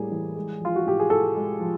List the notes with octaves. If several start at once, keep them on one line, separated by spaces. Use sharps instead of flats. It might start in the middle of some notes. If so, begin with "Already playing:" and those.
Already playing: A2 G3 A#3 G#4
E3
G#3
F3 F4
F#4
A2 G4
G#4
A2 A4
G#3
F3